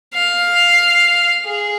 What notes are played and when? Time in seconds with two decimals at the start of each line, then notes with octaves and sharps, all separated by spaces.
0.14 F5
1.45 G#4